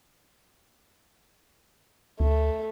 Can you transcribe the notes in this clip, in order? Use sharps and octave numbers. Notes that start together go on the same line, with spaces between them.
D2 A3